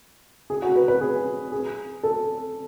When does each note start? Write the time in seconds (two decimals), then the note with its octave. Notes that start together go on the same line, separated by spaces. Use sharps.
0.50 G#4
0.62 F#4
0.75 B4
0.88 B4
1.01 G#4
1.52 G#4
2.03 A4